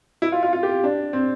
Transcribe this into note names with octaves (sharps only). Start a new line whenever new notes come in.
E4
F4
F4
F4
G4
D4
C4